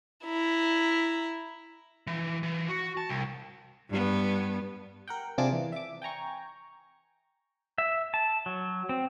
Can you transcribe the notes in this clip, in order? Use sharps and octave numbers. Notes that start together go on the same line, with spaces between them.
E4 A#5
E3
E3
F#4
A5
C2
G2 B3
A#4 F#5 G5
C3 D4 F4 G#4 A5 D6
E3
E5 D6
G5 G#5 A#5 C#6
E5
A5
F#3
C4